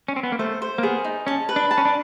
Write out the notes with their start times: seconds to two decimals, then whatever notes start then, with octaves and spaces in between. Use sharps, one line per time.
0.08 C#4
0.16 C4
0.23 B3
0.32 A#3
0.39 A3 C5
0.62 C5
0.78 A#3
0.83 B3 G#4
1.04 D#4
1.27 C#4 A5
1.49 B4
1.56 D4
1.71 A5
1.78 C#4
1.85 D4